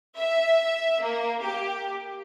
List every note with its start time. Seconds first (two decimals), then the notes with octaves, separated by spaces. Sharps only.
0.18 E5
1.03 A#3
1.43 G4